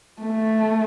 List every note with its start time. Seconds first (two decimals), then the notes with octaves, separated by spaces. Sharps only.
0.22 A3